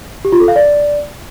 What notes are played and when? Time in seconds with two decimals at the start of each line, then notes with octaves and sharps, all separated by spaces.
0.25 G4
0.32 F4
0.40 A4
0.48 F5
0.56 D5